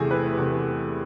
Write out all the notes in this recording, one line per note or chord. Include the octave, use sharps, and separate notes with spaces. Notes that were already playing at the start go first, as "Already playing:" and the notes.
Already playing: E2 C3 E3 A3 G#4
B4
E2 C3 E3 A3